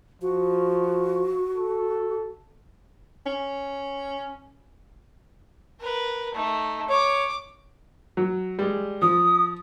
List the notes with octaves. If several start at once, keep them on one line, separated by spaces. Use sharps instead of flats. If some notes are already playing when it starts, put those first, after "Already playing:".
F3 F#4
A4
C#4
A#4 B4
A3 D#4
C#5 D6
F#3
G3 G#3
F3 D#6